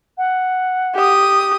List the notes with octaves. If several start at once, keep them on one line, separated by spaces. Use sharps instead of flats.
F#5
G4 D#6